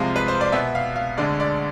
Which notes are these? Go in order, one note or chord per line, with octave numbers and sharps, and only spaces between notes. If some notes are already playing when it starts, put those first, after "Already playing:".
Already playing: C2 C3 F3 G#3 F5
B4
C5
D5
B2 B3 E5
F5
F5
D2 D3 G#3 D5
D5